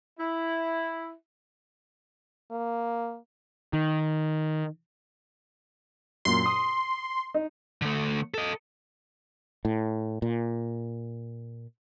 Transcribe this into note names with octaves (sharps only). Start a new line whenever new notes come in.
E4
A#3
D#3
F#2 A#2 C6
D#6
D#4
D3 A3
A4 D#5
A2
A#2